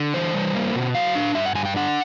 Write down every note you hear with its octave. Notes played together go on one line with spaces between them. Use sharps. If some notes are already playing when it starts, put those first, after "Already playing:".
Already playing: D3
E3 C5
G3
A#3
B2
F#3 F5
D4
G2 E5
F#5
G2 G#5
G5
D4 F#5